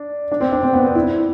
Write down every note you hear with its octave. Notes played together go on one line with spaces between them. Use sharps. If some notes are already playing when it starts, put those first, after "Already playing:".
Already playing: D4
D4
C4
D4
C4
B3
C4
E4